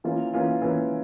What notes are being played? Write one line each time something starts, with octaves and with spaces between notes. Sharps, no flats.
E3 A#3 C#4 F4
E3 A#3 C#4 F4
E3 A#3 C#4 F4